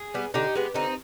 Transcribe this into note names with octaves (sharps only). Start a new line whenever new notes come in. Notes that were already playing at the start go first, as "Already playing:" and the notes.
Already playing: G#4
G3 B3
D3 D#4 G4
G#3 B3
D3 C4 D#4